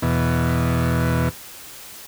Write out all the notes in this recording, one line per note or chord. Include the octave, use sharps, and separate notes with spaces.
E2 B2